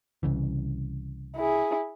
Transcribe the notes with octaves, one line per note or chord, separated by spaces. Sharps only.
C2 C#3 E3
E4 G#4